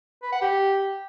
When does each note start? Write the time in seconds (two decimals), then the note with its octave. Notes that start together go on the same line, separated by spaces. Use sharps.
0.23 B4
0.32 F#5
0.42 G4